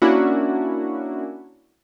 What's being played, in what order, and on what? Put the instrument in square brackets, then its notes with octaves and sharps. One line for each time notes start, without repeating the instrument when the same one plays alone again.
[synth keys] A#3 C#4 D4 E4 F#4